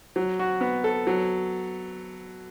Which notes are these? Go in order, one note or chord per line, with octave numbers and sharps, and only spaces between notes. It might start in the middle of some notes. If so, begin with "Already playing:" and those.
F#3
F#4
B3
A4
F#3